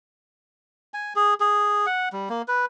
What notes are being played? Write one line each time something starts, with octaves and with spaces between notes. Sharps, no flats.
G#5
G#4
G#4
F#5
G3
A#3
B4